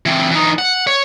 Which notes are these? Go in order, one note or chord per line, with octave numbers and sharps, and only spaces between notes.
E3 C4
E3 D#4
F#5
C#5